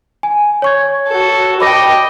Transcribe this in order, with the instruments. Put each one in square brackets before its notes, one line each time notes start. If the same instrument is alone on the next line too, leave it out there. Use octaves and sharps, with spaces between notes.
[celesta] G#5
C#5 C#6 G#6
[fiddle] F#4 A4
[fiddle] D#5 G5 [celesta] B5 D6 A#6